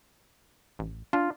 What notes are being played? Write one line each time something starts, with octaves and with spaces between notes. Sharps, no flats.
A1
D4 F4